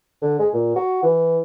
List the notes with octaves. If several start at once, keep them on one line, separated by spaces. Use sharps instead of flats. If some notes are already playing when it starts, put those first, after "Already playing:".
D3
G#3
A#2
F#4
E3